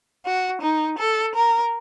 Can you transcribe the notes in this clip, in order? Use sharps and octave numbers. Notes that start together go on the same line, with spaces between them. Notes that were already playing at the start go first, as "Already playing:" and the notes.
F#4
D#4
A4
A#4